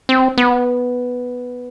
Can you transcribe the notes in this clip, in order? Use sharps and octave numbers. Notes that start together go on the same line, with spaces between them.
C4
B3